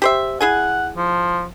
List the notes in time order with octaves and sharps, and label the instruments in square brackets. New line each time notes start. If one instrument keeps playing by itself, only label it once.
[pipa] G4 C5 E5
[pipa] E4 G#4 G#5 [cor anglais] F#5
[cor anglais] F3